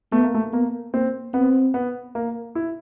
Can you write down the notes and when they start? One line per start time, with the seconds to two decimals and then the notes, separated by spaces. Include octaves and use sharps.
0.12 A3 B3
0.24 A#3
0.35 A3
0.53 A#3 B3
0.94 A#3 C4
1.34 B3 C4
1.74 B3
2.15 A#3
2.55 E4